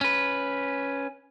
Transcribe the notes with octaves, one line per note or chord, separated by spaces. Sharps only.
C#4 B4